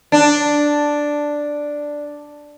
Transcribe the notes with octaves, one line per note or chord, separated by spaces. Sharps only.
D4